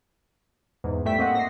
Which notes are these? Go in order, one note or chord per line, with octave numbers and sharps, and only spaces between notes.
E2 G#2
A2 G3 A3 E5 G5 B6
A#3 C4 F#4 D#5 F#5
A#6 C7